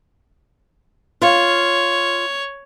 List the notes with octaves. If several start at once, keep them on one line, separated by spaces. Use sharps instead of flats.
F4 C#5